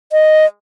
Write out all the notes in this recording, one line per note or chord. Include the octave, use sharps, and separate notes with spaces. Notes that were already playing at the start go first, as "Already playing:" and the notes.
D#5